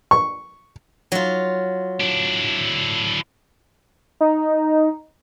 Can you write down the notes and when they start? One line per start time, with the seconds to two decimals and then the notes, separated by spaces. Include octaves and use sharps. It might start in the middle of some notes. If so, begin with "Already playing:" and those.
0.11 C#6
1.12 F#3 F4
2.00 D4 E4
4.21 D#4